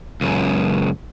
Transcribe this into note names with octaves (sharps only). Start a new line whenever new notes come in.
C#2 F#2